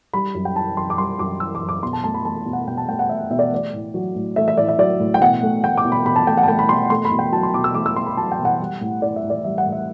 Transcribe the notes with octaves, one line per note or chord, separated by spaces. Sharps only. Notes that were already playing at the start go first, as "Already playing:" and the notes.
G3 B5
F#2
G5
E3 A5
F#2 C6
D6
G3 C6
F#2 D6
E3 E6
D6
F#2
D6
B2 C6
A5
A3 A5
B5
A3 A5
B2
F#5
B2 G5
A5
A3 G5
F#5
A3 E5
B2 E5
D5
A3 D5
A2
F#3
A2
A3 E5
E5
A2 D5
E5
F#3 D5
A2
G5
B2 F#5
A3
A3 G5
D6
B2
B5
B2 B5
A5
A3 G5
F#5
A5
A3 G5
B5
B2 C6
A3 C6
B5
B2
G5
F#3 A5
C6
B2 D6
E6
A3 D6
E6
B2 C6
B5
F#3 A5
G5
B2
F#5
G3
A2
E3 D5
E5
A2
D5
G3 E5
F#5
A2
E5